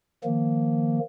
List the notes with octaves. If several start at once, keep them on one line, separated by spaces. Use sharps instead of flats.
D#3 F3 A#3